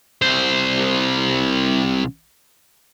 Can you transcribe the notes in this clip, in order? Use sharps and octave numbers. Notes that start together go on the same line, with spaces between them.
C2 C5